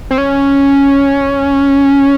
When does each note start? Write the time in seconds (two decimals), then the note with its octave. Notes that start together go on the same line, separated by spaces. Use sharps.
0.11 C4
0.18 C#4